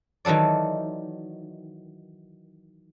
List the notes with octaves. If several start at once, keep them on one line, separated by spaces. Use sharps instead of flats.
D#3 E3 F#3 A4 D5